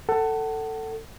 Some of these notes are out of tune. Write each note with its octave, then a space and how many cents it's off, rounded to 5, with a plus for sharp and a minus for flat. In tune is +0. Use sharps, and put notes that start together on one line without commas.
A4 +15 F#5 +30